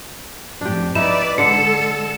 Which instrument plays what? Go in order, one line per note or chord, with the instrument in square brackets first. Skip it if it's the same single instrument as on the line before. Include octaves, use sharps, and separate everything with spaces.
[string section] F2 A2 [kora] D4 G4
[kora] D#4 E4 [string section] B4 D5 [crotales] E7
[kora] D3 [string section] G#3 A4 [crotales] C#7